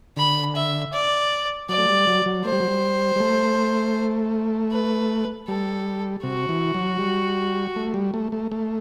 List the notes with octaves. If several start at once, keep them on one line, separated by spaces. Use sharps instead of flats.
D3 B5
E5
D5
F#3 D5
A3
G3
F#3
F#3
A3 C5
G3
F#3
G3
G3
A3
B4
G3 A4
C3 F#4
E3
F#3
G3
A3
G3
A3
A3
A3